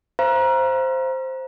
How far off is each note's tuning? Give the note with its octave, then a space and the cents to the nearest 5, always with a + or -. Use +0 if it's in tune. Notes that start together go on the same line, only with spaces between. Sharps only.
C5 +0 F5 -40 A#5 +25